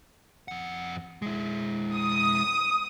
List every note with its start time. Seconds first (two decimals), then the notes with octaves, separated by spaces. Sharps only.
0.48 F2 F#5
1.22 G#3 E4
1.95 D#6